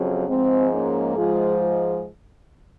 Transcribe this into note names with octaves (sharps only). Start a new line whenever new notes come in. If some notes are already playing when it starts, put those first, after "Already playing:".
Already playing: F2 C#3 F#3
G#2 F3 G#3 C4
A#3 C#4
G#2 F3 G#3 F4 G#4